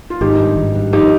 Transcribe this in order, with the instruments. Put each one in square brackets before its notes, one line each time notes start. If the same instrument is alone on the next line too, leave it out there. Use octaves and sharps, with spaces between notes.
[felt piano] F4
[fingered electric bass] G#1 [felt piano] D#4 G4
[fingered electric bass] G2
G#1
G2
[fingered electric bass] F3 [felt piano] D#4 G4